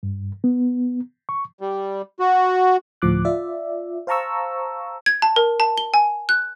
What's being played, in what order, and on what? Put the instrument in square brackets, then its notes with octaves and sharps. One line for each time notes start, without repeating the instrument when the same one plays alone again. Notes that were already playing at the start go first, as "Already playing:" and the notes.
[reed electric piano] G2
B3
C#6
[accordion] G3
F#4
[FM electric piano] D2 A2 F3 D6 F#6
F4 D5 E5
C5 F5 A5 A#5 C#6 E6
[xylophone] G#6
A5
A#4
A5
G7
G#5
F#6